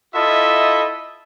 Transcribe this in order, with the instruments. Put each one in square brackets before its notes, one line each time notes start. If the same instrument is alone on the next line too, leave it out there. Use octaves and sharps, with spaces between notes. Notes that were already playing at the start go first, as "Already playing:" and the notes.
[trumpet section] E4 F4 A4 D#5 E5